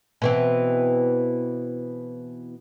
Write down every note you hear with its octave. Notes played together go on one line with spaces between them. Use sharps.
B2 E3 C4